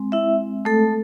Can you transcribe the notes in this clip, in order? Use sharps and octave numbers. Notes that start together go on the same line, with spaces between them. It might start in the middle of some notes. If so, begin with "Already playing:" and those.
Already playing: G#3 C4
E4 E5
A3 A4